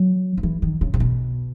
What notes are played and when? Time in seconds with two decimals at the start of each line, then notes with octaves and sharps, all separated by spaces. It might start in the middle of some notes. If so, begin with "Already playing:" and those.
Already playing: F#3
0.37 F3
0.43 E3
0.62 D#3
0.81 C#3
0.94 C3
1.00 B2